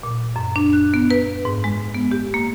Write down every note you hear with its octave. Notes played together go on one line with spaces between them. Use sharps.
A#2
F#2
D4
F#6
B3
B4
G#2
G#3
B3
G4
A#3